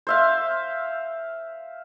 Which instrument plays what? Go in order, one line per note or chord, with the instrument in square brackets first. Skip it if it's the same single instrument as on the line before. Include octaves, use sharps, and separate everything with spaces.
[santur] C5 E5 F5